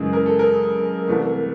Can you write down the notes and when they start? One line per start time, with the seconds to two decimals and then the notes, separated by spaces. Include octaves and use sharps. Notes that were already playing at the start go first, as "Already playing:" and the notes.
Already playing: F#2 C#3 E3 G#3 G#4
0.13 A#4
0.26 A4
0.39 A#4
1.08 C2 C3 E3 A3